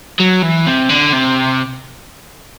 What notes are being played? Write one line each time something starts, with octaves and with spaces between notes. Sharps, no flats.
F#3
E3
C3
D3
C3